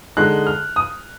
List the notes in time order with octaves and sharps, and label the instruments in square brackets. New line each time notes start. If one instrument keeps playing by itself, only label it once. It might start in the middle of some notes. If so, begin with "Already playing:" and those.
[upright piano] D3 G#3 D#4 F#6
F6
D#6